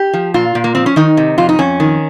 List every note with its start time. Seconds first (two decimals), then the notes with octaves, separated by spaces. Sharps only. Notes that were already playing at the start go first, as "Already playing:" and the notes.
Already playing: G4
0.13 F3
0.34 A#2 F4
0.55 A#2
0.64 A#3
0.75 F3 C4
0.86 C#4
0.96 D#3 D#4
1.17 C3
1.38 F2 F4
1.49 D#4
1.59 F2 C#4
1.80 D#3